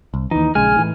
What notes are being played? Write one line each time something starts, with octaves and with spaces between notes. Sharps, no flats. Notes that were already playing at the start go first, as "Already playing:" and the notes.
C2
D#2 E3 D#4
A#1 C#3 G#3 G#5 F6
A2 E3